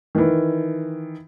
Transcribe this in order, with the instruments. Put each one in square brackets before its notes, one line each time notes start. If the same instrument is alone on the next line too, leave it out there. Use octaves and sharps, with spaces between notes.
[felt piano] D#3 E3